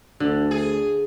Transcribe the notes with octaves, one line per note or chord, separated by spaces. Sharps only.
D2 D3
G#4